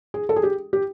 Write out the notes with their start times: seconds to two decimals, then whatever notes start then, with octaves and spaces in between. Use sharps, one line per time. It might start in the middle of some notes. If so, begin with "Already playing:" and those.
0.14 G#4
0.29 A4
0.36 G#4
0.43 G4
0.73 G4